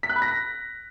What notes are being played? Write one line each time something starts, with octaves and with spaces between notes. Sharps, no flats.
B6
F#6
B5
A#6
B6